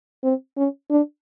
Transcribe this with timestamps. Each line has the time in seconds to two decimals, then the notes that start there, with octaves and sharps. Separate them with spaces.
0.23 C4
0.56 C#4
0.90 D4